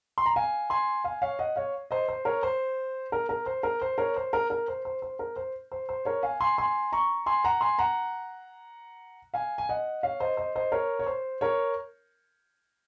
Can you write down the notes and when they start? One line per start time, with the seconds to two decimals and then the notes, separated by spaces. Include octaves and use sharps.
0.18 C6
0.26 A#5
0.36 F5 G#5
0.70 G#5 C6
1.04 F5 G#5
1.22 C#5 F5
1.39 D#5 F#5
1.56 C#5 F5
1.91 C5 D#5
2.09 C5
2.25 A#4 C#5
2.43 C5
3.12 A#4
3.29 A#4
3.46 C5
3.63 A#4
3.81 C5
3.98 A#4 C#5
4.16 C5
4.33 A#4
4.50 A#4
4.68 C5
4.85 C5
5.02 C5
5.19 A#4
5.36 C5
5.72 C5
5.89 C5
6.05 A#4 C#5
6.23 F5 G#5
6.40 G#5 C6
6.58 G#5 C6
6.92 A#5 C#6
7.26 G#5 C6
7.44 F#5 A#5
7.61 G#5 C6
7.79 F#5 A#5
9.34 F5 G#5
9.58 G#5
9.69 D#5 F#5
10.03 C#5 F5
10.20 C5 D#5
10.37 C5 D#5
10.55 C5 D#5
10.72 A#4 C#5
10.99 C#5
11.06 C5
11.41 A#4 C#5